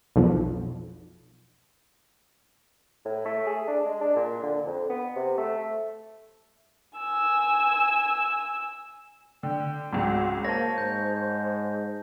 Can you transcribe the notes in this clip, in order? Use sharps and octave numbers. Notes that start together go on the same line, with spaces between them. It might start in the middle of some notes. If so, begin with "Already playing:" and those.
B1 F2
A2
A3
G#4
D4
G#3
D4
A#2
D3
F2
B3
C3
A3
G#5 E6
D3 G5
G#1 C#2 F#4
A#3 C5 C#5 A5 A#6
G#2 G6